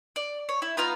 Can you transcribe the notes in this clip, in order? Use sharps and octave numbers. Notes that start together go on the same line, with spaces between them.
D5
C#5
E4
B3 D#4 F4 A#5